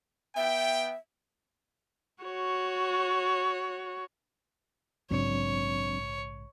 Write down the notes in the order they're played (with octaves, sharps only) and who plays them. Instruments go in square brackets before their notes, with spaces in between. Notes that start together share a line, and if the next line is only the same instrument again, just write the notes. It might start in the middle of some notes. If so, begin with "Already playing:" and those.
[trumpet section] B3 G5 [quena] E5
[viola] F#4 C#5
[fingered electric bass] A#1 G#2 C#3 [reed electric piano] F#3 C4 D4 [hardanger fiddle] C#5